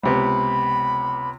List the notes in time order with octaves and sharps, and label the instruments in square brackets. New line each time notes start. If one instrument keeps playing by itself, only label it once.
[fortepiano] C#2 C3 B3 [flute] B5